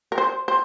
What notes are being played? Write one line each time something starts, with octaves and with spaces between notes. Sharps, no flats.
A#4
C5
C5